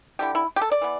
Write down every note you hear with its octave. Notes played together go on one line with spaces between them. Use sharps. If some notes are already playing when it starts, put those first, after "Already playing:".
D3 G3 E4 G4
E4
G4
A4
D5
E3 B3